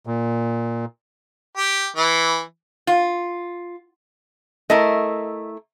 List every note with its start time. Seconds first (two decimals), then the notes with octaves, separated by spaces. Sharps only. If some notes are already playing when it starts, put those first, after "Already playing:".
0.07 A#2
1.57 G4
1.96 E3
2.87 F4
4.70 A3 E4 A#4 D#5